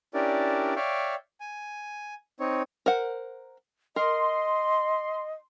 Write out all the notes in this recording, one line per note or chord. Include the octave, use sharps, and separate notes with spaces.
C#4 D4 E4 G4 A#4 D5
C#5 D5 E5 F5 G5
G#5
C4 D#4 C#5
A#4 C5 F#5
A#4 D#5 C6